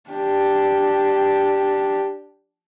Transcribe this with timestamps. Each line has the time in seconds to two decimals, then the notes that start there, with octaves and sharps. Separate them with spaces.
0.10 D4 G4